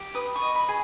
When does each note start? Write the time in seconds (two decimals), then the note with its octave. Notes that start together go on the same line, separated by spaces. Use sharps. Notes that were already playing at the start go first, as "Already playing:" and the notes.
Already playing: G4
0.15 B4 D#6
0.36 C#6
0.42 D#5
0.55 B5
0.69 G#4